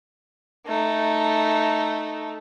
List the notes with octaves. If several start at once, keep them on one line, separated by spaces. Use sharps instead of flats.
A3 D#4